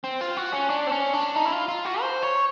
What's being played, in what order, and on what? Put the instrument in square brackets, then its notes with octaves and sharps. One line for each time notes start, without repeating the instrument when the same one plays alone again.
[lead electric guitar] C4
F4
F#4
C#4
D4
C4
C#4
D4
D#4
E4
F4
F4
F#4
C5
C#5